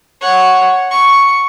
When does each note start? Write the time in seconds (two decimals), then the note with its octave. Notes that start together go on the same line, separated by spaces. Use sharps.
0.21 C#5 F#5
0.91 C#6